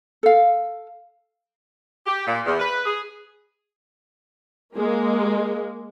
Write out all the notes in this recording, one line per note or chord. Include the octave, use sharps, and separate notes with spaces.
A4 F5
G4
A#2
E2
B4
G#4
G#3 A#3